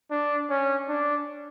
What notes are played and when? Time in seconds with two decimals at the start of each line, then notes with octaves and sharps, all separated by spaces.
0.11 D4
0.50 C#4
0.88 D4